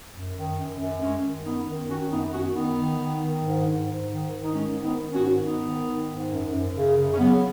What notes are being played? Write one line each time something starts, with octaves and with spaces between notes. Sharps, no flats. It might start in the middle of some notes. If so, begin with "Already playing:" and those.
F#2
D#3
F#2
F#2
F#2 G#3 C#4
D#3
F#2 B3 D#4
D#3
D#3 C#4 F#4
F#2 B3 D#4
F#2 C#4 F#4
D#3 B3 D#4
D#3
D#3
D#3
G#2
G#2
G#2
D#3
D#3
D#4
G#2 G#3 C#4
D#3
B3 D#4
D#3
C#4 F#4
G#2
G#2 B3 D#4
D#3
D#3
G#2
F#2
F#2
C#3
C#3
C#4
C#3 F#3 B3